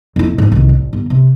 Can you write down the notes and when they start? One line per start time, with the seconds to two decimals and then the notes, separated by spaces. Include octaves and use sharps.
0.16 F2 E4
0.38 G#1 F2
0.52 C2 D#3
0.69 A1
0.93 G1
1.10 C3